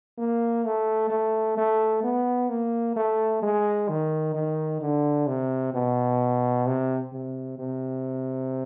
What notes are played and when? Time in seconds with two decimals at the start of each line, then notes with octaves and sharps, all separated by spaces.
0.18 A#3
0.65 A3
1.11 A3
1.57 A3
2.03 B3
2.49 A#3
2.96 A3
3.42 G#3
3.89 D#3
4.35 D#3
4.81 D3
5.27 C3
5.74 B2
6.66 C3
7.13 C3
7.59 C3